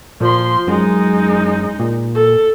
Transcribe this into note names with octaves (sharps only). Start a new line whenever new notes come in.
A#2 F3 C6
F#2 G#3 D#4
A#2
A4